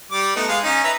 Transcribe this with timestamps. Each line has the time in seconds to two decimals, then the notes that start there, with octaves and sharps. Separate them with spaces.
0.11 G3 D6
0.36 A3 B3 D#4
0.48 G#3 F5
0.64 C#4 D#4
0.84 B4 E5 A#5